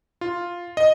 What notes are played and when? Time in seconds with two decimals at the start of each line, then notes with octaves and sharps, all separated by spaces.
0.21 F4
0.77 D#5